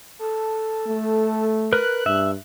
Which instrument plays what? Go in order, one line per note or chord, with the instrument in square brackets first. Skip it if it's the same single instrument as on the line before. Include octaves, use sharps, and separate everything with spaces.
[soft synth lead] A4
[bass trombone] A3
[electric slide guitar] A#4 B4 [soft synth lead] F#6
[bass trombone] G2 [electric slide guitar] E5